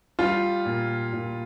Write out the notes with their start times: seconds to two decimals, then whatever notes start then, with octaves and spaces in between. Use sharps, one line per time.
0.19 G3 F4
0.65 A#2
1.13 A#2